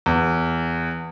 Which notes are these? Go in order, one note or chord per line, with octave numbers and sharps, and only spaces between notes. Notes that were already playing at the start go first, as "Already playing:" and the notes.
E2